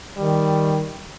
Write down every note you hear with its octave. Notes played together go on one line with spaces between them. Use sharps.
D#3 G3